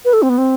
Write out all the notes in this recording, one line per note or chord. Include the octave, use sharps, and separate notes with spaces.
B4
A4
C4
B3
C4